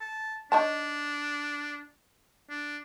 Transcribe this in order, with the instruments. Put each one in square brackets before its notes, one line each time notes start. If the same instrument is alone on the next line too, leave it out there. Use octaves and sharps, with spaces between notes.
[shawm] A5
[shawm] D4 [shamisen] D#4 C#5 A5
[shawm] D4